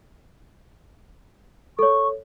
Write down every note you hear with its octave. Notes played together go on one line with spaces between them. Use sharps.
A4 C#5 C#6